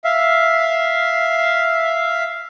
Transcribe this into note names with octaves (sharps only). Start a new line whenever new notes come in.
E5 F5